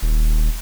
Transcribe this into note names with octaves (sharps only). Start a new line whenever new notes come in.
D#1